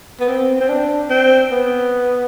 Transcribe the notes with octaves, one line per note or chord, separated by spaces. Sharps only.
B3
C4
C4
D4
C4
B3